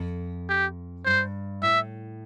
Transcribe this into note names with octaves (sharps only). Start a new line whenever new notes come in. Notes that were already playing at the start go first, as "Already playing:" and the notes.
Already playing: F2
G4
G2 C5
A2 E5